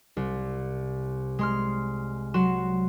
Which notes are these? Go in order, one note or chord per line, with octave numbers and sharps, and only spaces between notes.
C2
G#3 C6 F6
F#3 F#4 C6 E7